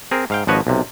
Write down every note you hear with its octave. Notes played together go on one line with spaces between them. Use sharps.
C4 G#4 A#4
G#2 F5 G5
G#1 F3 F#4 B4 C#5 D#5
B1 C3